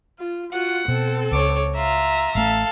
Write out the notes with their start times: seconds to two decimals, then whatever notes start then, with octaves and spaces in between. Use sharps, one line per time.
0.19 F4
0.52 F4 F#4 F#5
0.88 B2 C4 A4
1.31 C#2 C#5 D6
1.76 F4 E5 A#5
2.35 A1 A3 A4 F5